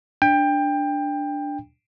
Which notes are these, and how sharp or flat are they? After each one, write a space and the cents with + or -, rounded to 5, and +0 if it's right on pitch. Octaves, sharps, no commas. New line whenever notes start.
D4 +0 G5 +20